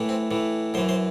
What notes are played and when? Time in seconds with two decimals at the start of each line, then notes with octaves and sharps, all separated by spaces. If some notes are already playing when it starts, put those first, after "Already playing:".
Already playing: A2 E3
0.09 C4
0.31 A2 E3
0.74 F#2 C5
0.78 E3
0.89 C5